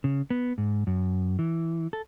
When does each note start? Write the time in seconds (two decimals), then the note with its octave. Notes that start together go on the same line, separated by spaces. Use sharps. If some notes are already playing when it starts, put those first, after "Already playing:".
0.04 C#3
0.30 B3
0.58 G#2
0.87 F#2
1.39 E3
1.93 A4